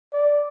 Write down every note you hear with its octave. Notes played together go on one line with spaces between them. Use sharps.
D5